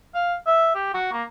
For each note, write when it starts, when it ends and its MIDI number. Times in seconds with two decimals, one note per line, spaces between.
0.15 0.35 77
0.47 0.71 76
0.75 0.93 67
0.94 1.09 66
1.13 1.23 58